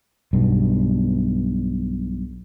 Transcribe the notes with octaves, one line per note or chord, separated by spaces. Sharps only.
B1 G2 B2